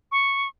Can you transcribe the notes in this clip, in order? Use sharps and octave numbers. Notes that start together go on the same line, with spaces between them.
C#6